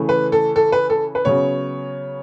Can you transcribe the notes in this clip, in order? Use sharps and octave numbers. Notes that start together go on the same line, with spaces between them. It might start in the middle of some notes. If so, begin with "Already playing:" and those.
Already playing: C#3 E3 A3
B4
A4
A4
B4
A4
B4
C#3 F#3 B3 C#5